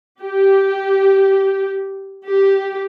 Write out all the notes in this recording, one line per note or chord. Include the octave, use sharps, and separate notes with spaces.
G4
G4